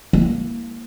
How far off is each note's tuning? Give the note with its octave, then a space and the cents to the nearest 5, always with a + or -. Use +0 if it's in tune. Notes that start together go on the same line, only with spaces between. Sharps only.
A#3 +0 E4 +0